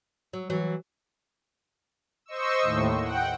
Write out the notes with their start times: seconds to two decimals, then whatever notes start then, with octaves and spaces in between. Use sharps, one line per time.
0.33 F#3
0.50 E3 F#3
2.26 C5 D#5 C#6 E6
2.62 D#2 A2
3.02 F#5 G5